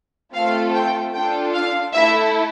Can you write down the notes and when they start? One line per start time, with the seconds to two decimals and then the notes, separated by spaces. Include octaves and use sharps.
0.33 A3 C4 F4 A4 F5
0.73 G5
1.13 D4 F4 A4 G5
1.53 F5
1.93 A3 E4 A4 E5